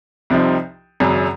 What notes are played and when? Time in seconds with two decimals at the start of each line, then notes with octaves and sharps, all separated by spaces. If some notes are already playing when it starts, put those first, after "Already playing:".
0.30 C2 C3 F3 C4 D#4
1.00 G#1 F#2 C#3 F#3